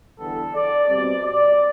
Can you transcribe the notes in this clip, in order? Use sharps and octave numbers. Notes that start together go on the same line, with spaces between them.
E2 D3 G3 B3 A4
D5
B2 G3 C4 D5
D5